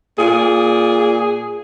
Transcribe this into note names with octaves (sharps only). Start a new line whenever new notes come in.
A#2 G#4